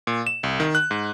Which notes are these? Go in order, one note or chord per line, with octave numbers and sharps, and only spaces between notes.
A#2
E7
C2
D#3
F#6
G#2